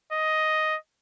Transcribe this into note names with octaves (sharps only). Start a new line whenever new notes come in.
D#5